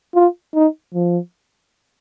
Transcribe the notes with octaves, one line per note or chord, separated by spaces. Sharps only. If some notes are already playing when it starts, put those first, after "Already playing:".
F4
D#4
F3